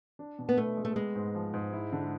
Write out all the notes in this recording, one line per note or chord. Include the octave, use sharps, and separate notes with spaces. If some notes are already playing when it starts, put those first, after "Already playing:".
D4
B2
B3
B2 A3
G#3
A3
G#3 B3
G#2
F3
G#2
E4
D3